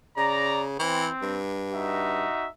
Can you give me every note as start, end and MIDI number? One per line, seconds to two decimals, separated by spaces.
0.17 0.77 49
0.17 0.64 74
0.17 0.64 82
0.79 1.08 52
0.79 1.39 60
1.22 2.29 43
1.73 2.47 63
1.73 2.47 66
1.73 2.47 76